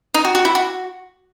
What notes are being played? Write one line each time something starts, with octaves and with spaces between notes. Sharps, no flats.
D#4
F#4
F#4
E4
F#4